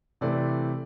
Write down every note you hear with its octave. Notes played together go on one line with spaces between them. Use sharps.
C3 E3 A3 C4 D5